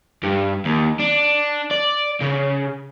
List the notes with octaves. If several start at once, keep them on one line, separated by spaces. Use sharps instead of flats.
G2
D#2
D4
D5
C#3